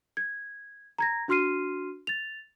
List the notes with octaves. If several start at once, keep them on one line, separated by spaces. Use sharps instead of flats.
G#6
A#5 G#6 A#6
D4 F#4 C6 F6 C7 D#7
A6 F7